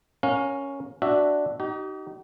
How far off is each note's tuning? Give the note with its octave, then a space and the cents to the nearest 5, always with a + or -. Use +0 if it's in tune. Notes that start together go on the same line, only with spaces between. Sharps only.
C#4 +0 A#4 +0 F5 +30
D4 +0 F#4 +0 E5 +0
D#4 +0 G4 -45